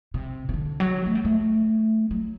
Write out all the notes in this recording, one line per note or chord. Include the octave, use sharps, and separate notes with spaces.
C3
C3
D3
F#3
A3
G3
A3
F#3